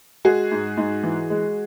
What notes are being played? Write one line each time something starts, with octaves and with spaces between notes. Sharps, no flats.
G#3 F#4 G#4
G#2
G#2
E3
G#3